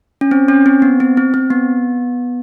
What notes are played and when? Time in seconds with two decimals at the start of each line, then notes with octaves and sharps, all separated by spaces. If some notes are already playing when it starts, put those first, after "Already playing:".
0.21 C#4
0.31 C4
0.48 C#4
0.66 C4
0.82 B3
1.00 C4
1.17 C4
1.34 C4
1.50 B3